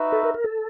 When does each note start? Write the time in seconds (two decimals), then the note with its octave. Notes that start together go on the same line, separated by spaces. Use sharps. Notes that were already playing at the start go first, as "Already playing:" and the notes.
Already playing: D#4 F#4 B4 E5
0.12 A4
0.23 A#4
0.34 A#4
0.44 A4